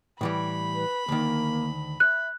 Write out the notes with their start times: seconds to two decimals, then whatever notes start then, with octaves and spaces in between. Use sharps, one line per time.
0.21 A2 E3 G3 B5
0.74 B4
1.08 D2 D#3 A#3
2.00 E5 F#6